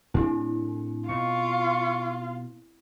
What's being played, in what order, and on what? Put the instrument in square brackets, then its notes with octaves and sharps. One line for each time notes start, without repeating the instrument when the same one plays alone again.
[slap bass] A2 D4 [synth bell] C4 E4
[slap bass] B2 [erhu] F4 [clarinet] C#6